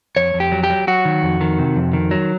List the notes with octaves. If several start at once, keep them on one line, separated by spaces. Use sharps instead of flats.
F2 C#5
F2
G4
F#3
G4
F#3
F#3 F#4
D#3
F2
D#3
C3
F2
D#3
F#3